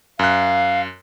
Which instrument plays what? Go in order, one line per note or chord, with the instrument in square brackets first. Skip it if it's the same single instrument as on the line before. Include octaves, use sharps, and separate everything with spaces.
[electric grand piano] F#2 F#6 [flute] F5